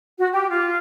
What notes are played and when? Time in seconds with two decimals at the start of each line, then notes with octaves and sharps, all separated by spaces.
0.19 F#4
0.32 G4
0.48 F4